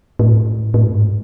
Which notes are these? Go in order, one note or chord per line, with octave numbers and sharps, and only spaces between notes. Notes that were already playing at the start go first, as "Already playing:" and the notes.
A2
A2
G#2